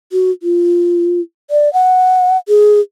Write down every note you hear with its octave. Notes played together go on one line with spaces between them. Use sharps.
F#4
F4
D5
F#5
G#4